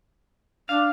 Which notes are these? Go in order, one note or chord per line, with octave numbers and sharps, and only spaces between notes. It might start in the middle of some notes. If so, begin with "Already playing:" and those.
D4 F5